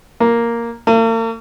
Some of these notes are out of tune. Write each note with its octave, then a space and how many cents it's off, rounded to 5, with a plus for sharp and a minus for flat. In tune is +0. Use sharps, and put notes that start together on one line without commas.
A#3 +0
A#3 -45